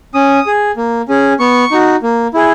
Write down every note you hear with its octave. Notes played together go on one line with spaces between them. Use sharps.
C#4 D#6
G#4
A#3
C#4 G#4
B3 C#6
D#4 F#4
A#3
E4 G#4